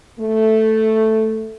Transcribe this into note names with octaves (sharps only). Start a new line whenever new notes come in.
A3